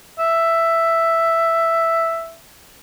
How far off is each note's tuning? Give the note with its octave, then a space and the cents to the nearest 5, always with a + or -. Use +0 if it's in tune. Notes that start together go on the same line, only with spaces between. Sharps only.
E5 +5